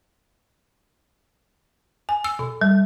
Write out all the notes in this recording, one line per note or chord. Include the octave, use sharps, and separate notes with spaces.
G#5
E6
B2
G3